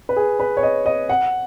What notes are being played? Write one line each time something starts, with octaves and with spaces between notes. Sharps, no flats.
B4
G#4
B4
C#5
D#5
D#5
F#5